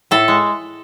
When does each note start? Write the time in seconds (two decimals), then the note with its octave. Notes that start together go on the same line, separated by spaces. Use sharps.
0.11 A2 A4
0.28 G#3